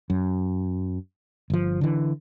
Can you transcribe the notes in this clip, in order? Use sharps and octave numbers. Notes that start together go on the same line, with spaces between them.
F#2
G1 F3
D3 E3